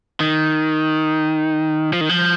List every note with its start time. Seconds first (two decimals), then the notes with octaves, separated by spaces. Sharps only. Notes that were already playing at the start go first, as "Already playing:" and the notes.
0.20 D#3
1.93 F3
2.01 D#3
2.09 F3